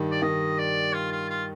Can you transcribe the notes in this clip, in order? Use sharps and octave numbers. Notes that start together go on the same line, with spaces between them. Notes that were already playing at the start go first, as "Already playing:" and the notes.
Already playing: G2 D#3 G3
D5
D#3 D#5
D5
F4
F4
F4